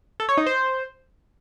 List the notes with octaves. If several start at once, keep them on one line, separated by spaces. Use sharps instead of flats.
A4
C#5
D#4
C5